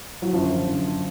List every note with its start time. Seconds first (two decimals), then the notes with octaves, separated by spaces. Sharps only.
0.22 F#3
0.33 F#1 F#2 D3 F3
0.66 F#1 F#2 D3